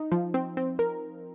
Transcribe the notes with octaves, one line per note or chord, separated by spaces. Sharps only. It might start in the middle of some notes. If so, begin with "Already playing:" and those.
Already playing: D#4
F3
C4
C4
A#4